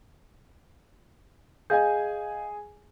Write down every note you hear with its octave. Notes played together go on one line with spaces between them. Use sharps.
G#4 D#5 F5 G#5 G6